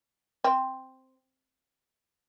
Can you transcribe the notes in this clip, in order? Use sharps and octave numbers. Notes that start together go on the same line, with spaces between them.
C4